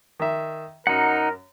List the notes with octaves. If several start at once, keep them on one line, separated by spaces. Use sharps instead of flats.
D#3 E5
F#2 D#4 A#4 F#5